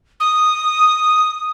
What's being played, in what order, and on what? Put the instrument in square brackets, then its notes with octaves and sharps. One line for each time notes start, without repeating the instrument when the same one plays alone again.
[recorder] D#6